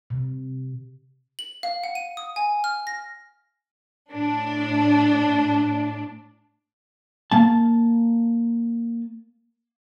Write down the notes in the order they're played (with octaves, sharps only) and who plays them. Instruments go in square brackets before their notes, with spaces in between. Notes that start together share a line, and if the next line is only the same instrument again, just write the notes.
[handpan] C3
[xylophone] F#7
F5
F#5
D#7
D#6
G#5
F6
A#6
[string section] A2 D4
[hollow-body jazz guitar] A#3 A5